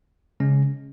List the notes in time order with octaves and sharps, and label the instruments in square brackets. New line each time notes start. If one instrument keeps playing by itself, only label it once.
[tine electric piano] C#3 G#3 C#4